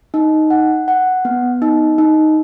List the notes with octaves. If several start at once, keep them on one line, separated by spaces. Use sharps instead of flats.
D#4
F#5
F#5
B3
D#4
D#4